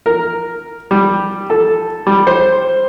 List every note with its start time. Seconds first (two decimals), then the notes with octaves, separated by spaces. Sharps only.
0.06 A#4
0.91 G3
1.50 A4
2.07 G3
2.27 C5